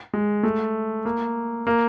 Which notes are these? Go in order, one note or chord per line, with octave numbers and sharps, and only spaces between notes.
G#3
A3
A#3
A#3